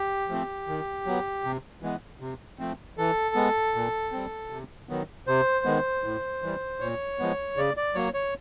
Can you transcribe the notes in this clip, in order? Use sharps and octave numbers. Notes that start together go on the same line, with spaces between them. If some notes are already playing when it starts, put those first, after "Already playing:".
Already playing: G4
F3 A3 C4
D#3
F#3 B3
C3
E3 G#3 B3
C3
F3 A3 C4
E3 A4
G#3 B3
A#2
G3 C4
C3
D#3 F#3 B3
C3 C5
D#3 G#3 B3
A2
E3 G3
A#2 C#5
F3 G#3 B3
C#3 D5
D5
F#3 A#3 C#5
C#5